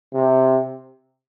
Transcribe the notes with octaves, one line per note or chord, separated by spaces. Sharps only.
C3